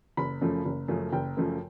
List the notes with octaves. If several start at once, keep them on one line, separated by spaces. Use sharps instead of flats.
F#1 B5
F#2 C#3 F3 A3
F#1
F#2 C#3 F3 A3
F#1 G5
F#2 C#3 F3 A3